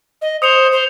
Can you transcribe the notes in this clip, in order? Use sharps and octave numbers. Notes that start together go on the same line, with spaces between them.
D#5
C5 D#6 C#7 F7
C5